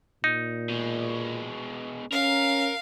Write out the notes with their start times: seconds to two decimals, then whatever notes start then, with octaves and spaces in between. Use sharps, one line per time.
0.24 A#2 D#4
0.69 B2 G#3
2.12 C#4 A#4 F5